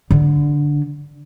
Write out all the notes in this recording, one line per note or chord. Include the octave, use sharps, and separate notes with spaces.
D3